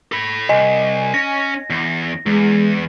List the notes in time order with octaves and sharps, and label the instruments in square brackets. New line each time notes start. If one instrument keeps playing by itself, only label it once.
[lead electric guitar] A4 B5
[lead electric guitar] C2 [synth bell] D#5 G#5
[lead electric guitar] C#4 [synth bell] A#6
[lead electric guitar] E2
[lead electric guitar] E2 [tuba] G#3